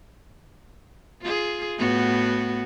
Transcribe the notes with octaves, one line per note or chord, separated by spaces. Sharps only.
F4 G#4
A2 B3 F#4